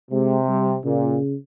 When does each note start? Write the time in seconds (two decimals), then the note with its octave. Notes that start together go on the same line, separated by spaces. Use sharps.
0.12 C3 G#3
0.48 G3
0.84 A#2 C#3